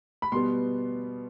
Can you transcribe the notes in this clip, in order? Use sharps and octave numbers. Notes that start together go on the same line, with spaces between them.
B5
B2 G3 B3 C6